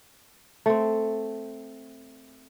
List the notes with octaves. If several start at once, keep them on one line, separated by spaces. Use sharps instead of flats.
A3 C4